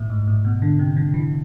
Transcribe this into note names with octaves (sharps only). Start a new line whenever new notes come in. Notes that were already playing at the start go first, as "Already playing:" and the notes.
Already playing: A2
G#2
A2
B2
D3
C3
D3
E3